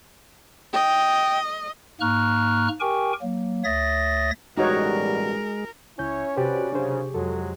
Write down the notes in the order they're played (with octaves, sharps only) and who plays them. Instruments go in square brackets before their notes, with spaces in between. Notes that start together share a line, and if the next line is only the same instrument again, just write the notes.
[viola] D#5 [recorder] G5
[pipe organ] G#2 A#3 A#5 C#6 F6 F#6
G4 A#4 G5 G#5 C#6
F#3 A#3
D2 C#5 E5 D#6 A6 A#6
[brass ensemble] A1 B2 G3 [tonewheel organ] G#3 [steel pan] D#4 F#4 C#5 [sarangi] A#4
[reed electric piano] C#2 G6 [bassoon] C#4 [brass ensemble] E4 C#5
[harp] C3 G6 A6 [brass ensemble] F#4 B4 D5 [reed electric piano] G4 C5
[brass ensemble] F#2 C#3 F#3 [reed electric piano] D4 C5 [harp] G4 G#4 C#5
[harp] F2 [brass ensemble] F#3 G#3 [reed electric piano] A4